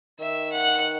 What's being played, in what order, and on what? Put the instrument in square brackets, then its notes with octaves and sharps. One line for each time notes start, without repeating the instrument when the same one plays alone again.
[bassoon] D#3 [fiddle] E5
[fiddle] F#5